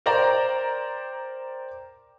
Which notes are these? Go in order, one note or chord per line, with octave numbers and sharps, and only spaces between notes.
A#4 C5 D5 G5 A#5